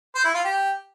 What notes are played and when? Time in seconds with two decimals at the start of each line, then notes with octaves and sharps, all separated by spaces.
0.15 C5
0.24 E4
0.34 F4
0.44 G4